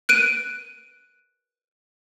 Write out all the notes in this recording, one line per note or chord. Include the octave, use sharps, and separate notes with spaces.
F#6 D7 D#7